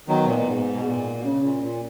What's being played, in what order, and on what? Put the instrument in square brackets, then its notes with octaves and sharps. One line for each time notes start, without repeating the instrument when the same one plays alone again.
[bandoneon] D#3 F#3 [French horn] B3
[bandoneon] B2
A#2
A#2
G#2
B2
A#2
B2
[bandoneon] C#3 [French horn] C#4
[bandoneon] A#2
A#2